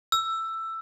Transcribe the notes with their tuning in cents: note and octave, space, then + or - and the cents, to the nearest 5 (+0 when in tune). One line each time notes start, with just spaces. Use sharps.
E6 +10